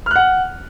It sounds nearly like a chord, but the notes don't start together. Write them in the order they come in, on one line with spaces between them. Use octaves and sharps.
F6 F#6 F#5